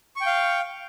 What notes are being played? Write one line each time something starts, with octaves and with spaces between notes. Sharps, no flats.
F5 G5 C#6